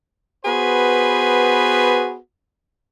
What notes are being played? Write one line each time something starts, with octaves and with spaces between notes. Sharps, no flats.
B3 F#4 G#4 B4 C5